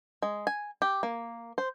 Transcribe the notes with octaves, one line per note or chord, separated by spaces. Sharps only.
G#3
G#5
G4
A#3
C5